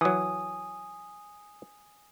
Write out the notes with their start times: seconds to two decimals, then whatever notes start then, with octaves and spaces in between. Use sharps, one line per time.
0.01 E3 F#3 G#5 D#6